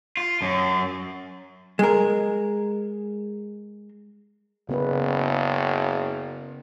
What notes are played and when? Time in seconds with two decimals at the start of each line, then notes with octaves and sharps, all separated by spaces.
0.17 F4
0.42 F#2
1.79 G#3 A#4
4.69 F#1 C#3 B3 B4